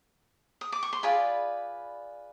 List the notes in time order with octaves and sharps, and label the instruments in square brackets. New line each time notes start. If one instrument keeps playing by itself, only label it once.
[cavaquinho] D#6
D6
C#6
C6
F4 G#4 B4 D5 B5